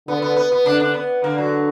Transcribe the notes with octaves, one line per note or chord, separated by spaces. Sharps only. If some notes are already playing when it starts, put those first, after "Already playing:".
D3 B3
B3
B3
B3
D3 D4
D4
B3
D3 A#3
F#3